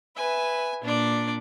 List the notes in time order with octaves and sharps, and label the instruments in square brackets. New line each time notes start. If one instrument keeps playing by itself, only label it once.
[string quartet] B4 E5 [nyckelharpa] G#5
[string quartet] A#2 [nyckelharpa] D4 D5